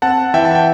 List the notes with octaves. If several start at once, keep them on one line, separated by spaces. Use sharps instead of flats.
C4 F#5 A5
E3 E5 G5
A5
G5